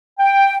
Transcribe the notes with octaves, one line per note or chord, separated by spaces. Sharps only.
G5